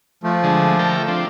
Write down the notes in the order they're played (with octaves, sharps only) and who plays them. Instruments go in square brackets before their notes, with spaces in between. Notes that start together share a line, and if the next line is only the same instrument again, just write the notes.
[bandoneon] F3 A3
[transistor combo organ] D3 G#3
A4 A#4 G5
F3 C4 D4